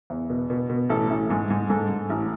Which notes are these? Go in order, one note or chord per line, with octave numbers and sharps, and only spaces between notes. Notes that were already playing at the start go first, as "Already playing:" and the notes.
E2
B2
B2
B2
A1 A4
A1
G#2
G#2
G#2 A4
G#2
A1